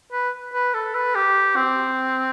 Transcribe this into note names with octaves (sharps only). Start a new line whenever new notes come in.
B4
B4
A4
B4
G4
C4